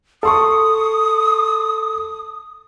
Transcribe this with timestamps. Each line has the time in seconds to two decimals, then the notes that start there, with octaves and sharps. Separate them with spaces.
0.23 A4 C6 C#6 D#6